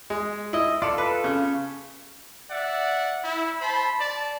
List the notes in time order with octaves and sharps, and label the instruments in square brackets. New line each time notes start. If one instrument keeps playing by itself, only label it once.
[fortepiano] G#3
E4 D#5
[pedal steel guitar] F4 A4 [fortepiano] D5
[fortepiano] B4
C#3
[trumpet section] D5 E5 F#5
E4
C5 A5 B5
D5 A5